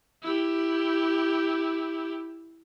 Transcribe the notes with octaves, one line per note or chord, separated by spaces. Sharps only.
E4 G4